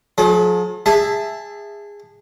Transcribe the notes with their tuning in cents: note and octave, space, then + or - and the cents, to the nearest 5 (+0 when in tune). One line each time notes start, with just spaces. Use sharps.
F3 +45 G#4 +45
G#4 -20 E5 +0 A5 +0